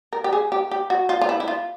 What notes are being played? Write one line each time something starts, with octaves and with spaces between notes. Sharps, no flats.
A#4
G4
G#4
G4
G4
F#4
F4
F4
E4
E4
F4